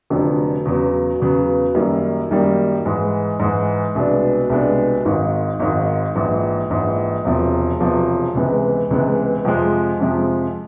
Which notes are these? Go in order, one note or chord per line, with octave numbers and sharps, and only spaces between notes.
F1 F2 D3 F#3
E2 C#3 F#3 B3
E2 C#3 F#3 B3
F#2 D#3 G3 A#3
F#2 D#3 G3 A#3
G#2 E3 G#3
G#2 E3 G#3
C2 B2 G#3 B3 D4
C2 B2 G#3 B3 D4
G#1 G#2 D#3
G#1 G#2 D#3
A#1 G#2 E3
A#1 G#2 E3
E1 E2 C3 F3
E1 E2 C3 F3
C#2 C3 E3 G#3 B3
C#2 C3 E3 G#3 B3
F2 C3 F3 G#3
F2 C3 F3 G#3